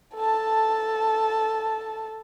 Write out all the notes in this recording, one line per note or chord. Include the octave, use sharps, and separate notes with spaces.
A4 A5